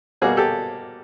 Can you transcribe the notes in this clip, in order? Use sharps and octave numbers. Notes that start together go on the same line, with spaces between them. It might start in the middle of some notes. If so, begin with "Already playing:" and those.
B2 G3 A#3 F#4 G#4
G4 A4